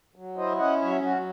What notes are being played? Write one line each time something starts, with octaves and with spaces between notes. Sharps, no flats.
F#3
E4 C5 D#5
C#4 D#5 F#5
F#3 C#5 E5
F#3 F#4